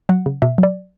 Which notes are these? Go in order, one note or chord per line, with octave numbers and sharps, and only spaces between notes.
F#3 F#5
C#3
B2 E5
F#3
D5